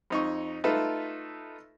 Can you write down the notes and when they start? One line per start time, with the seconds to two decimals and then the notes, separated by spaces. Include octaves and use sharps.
0.10 F2 D#4 C#6
0.64 A3 D#4 F4 A4 B4 E5